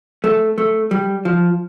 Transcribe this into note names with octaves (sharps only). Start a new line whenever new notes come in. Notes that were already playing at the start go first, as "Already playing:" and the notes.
A3
A3
G3
F3